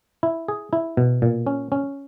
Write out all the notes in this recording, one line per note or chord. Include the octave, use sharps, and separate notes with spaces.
E4
G#4
E4
B2
A#2
C#4
C#4